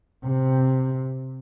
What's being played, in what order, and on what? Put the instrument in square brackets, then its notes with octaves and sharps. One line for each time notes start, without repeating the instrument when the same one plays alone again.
[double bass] C3